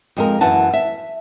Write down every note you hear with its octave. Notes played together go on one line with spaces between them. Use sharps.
F2 G#3 A#4
F#2 E3 F#5 A5
E5